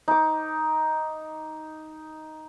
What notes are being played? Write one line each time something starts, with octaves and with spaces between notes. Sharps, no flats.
D#4 D6